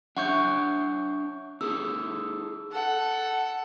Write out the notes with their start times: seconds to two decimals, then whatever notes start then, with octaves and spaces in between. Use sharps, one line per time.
0.17 D4 C#5 E5 F#5 C#6 G6
1.61 D#4 G#4 A4 E6
2.72 A4 F#5